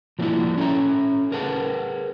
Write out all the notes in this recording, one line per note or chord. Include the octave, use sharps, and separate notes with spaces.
F3 F#3 A#3 D4 E4 F#4
C#4 A4 E5 A#5
G#4 A#4 B4 F#5 A5